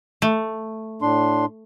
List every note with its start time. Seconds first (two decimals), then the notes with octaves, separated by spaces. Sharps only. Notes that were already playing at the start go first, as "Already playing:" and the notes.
0.22 A3
1.02 A2 D4 C6